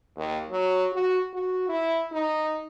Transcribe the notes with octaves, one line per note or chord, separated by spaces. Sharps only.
D#2
F#3
F#4
F#4
E4
D#4